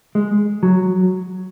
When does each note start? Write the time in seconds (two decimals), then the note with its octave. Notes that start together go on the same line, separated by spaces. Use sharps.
0.15 G#3
0.63 F#3